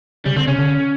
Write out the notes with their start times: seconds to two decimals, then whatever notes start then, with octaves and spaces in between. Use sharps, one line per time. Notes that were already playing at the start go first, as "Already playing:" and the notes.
0.25 C#3 G3
0.36 D3 C4
0.47 C#3 C#4
0.58 D3